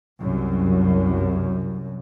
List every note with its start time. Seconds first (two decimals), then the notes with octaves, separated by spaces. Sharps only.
0.22 C2 F#2